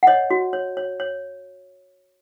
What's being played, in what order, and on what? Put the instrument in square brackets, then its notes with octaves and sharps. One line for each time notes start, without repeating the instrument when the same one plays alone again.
[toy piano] F#5
C#5 D#5
F#4
C#5
C#5
C#5